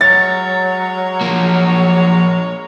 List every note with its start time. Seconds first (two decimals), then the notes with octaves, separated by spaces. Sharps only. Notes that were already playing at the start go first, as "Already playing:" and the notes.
0.01 F#3 G#3 A#4 C#5 A6
1.21 F3 A#3